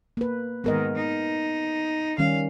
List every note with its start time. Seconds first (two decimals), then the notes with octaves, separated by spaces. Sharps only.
0.17 A#3 B4
0.64 G#2 D#3 B3 A#4 D#5
0.96 D#4
2.18 D#3 G3 C#4 F5